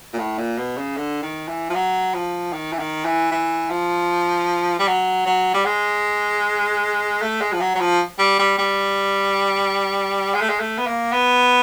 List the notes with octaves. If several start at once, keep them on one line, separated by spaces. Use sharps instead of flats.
A#2
A2
A#2
B2
C#3
D3
D#3
E3
F3
F#3
F3
D#3
E3
D#3
E3
E3
F3
G3
F#3
F#3
G3
G#3
A3
G#3
F3
F#3
F#3
F3
G3
G3
G3
G#3
A3
G#3
A3
B3
A#3
B3